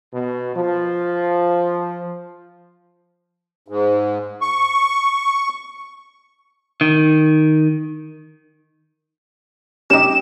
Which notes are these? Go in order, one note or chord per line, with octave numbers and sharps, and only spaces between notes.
B2
F3
G#2
C#6
D#3
C#4 D#4 G4 D6 E7